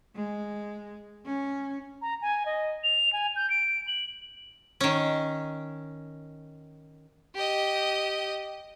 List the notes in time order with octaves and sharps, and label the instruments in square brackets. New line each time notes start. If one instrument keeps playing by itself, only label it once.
[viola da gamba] G#3
C#4
[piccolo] A#5
G#5
D#5
F7
G#5
G6
D7
F#7
[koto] D#3 C#4
[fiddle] G4 D#5